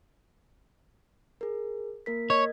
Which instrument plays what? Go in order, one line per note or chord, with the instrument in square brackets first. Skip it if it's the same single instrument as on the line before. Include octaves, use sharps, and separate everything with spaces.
[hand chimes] G#4 A#4
A#3 A#4 B6
[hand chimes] A#4 D#5 G#6 [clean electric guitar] C#5